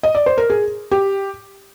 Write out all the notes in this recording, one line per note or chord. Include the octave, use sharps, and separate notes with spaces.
D#5
D5
C5
A#4
G#4
G4